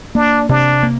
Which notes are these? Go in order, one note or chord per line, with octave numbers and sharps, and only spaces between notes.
A#3 D4
C3 D4
A#3